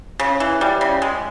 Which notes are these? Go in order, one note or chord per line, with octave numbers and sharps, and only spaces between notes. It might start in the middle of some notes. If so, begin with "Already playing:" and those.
C#3
E3
G3
C#3
G#3